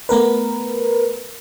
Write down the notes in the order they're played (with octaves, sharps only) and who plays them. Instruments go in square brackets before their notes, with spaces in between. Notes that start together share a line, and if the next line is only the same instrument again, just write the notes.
[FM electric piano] A3 B3 A#4 B4